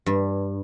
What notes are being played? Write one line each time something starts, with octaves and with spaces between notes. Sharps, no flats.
G2